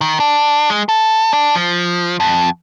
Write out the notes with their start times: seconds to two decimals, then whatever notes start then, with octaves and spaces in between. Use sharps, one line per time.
0.01 D#3
0.20 D4
0.70 G#3
0.89 A4
1.33 D4
1.55 F3
2.20 F2